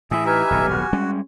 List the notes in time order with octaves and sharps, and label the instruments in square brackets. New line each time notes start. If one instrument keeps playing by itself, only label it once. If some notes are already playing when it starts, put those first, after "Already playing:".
[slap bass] A2 E3 [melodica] G#4 E5
[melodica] D#4 E5 [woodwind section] G4 G#5 [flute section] B4 F6
[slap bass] D#1 B1 G#2
[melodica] F#4
[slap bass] G3 G#3 C#4